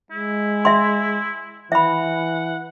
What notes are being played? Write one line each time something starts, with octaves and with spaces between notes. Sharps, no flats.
G#3 E4
E5 C6
E3 E5 F#5 B5